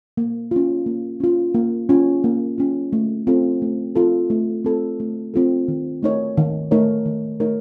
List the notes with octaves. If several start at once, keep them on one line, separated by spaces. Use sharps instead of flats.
A#3
C#4 F4
A#3
C#4 F4
A#3
C#4 F4
A#3
C#4 F4
A3
C4 F4 A4
A3
C4 F4 A4
A3
C4 F4 A4
A3
C4 F4 A4
D#3
A3 D#4 A#4 C#5
D#3
A3 D#4 A#4 C#5
D#3
A3 D#4 A#4 C#5